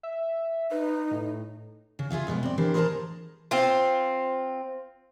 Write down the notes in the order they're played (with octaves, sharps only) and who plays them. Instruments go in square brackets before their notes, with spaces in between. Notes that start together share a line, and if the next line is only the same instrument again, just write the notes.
[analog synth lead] E5
[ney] D#4 [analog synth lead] B4
[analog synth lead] A2
[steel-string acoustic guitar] C#3
F4 G#4 E5 F5
F#2 B2 F3 G#3
C4 D5
E3 D4 G4 A#4 C5
G#4 A#4 C5 D5 A5 A#5
[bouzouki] C4 F4